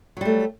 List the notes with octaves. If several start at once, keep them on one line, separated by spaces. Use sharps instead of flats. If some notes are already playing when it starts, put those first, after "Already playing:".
F#3 G3 A3